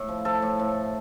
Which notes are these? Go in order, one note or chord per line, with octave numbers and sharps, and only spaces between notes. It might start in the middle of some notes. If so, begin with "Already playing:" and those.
Already playing: A2
F3
F3 A4
A2
A2